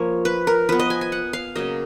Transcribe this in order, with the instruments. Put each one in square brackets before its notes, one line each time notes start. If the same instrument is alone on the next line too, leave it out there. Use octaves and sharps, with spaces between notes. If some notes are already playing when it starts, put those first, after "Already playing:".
Already playing: [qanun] F3 A#3 C#5
B4
A#4
F3 B3 B4
D#5
G#5
G#5
F#5
F5
C#3 F#3 A#3 D#5